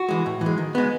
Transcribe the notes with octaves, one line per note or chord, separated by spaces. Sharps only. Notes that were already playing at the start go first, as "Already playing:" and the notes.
Already playing: F#4
E3 G#3
A2
E3
G#3
D#3
G#3 B3